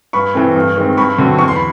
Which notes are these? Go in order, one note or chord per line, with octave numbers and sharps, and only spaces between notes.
G2 B5 C#6
E3 A3 C4
G2
D#3 G#3 C4
G2 B5 C#6
D3 F#3 A3 C4
E2 C#6
C6
B5